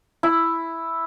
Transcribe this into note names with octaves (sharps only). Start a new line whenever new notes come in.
E4